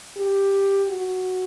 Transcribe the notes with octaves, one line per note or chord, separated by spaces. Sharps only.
G4
F#4